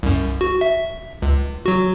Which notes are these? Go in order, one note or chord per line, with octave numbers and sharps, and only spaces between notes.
C2 F#2
F#4
E5
C#2
F#3 F#4